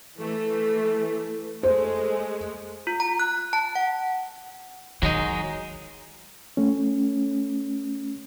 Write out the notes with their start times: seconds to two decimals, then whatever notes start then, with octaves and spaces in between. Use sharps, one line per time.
0.17 E3 A3
1.63 G#3 A3 C5
2.87 F4
3.00 A#5
3.20 F#6
3.53 A5
3.75 F#5
5.03 D#3 F#3 G#3 D#4
6.57 A3 C#4